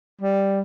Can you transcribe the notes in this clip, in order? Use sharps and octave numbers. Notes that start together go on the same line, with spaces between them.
G3